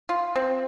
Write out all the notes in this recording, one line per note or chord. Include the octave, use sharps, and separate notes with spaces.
F4
C4